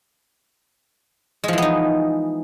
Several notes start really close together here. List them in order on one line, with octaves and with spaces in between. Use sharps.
G#3 F3 E3 B3 D#4